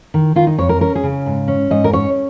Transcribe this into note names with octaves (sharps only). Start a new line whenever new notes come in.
D#3
D#3 F4
D#4
F2 C#5
A#4
C#4 A#4
G#4
C#3
G#2
C#4
G#2 D#5
A#4
C#4 C#5